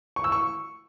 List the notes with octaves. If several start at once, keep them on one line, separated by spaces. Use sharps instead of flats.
C#6
E6
C#6